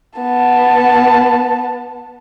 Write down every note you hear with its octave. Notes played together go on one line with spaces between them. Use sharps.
B3 A5